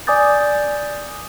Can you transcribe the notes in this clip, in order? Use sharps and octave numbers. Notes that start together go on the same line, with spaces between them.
D5 G#5 D6 D#6 G6 A6